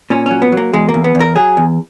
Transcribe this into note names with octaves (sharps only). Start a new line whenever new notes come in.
A#2 C#4
F#3 C#4
B3
F#3
A#3
E2 G#3
A#3
E2
B3
E2
A#4
F#3 G#4
E2